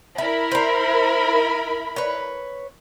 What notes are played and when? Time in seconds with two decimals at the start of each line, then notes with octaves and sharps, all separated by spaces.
0.18 E4 A#4 E5 B5
0.52 C5 A#5
1.96 B4 C#5